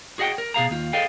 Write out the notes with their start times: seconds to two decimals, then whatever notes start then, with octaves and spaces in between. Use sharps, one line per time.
0.18 F#4 G#4 D#5 F#5 G5
0.38 A#4
0.54 B2 G#4 F5 A#5
0.70 D#2 F4
0.93 G#4 A4 B4 D#5 F5 G5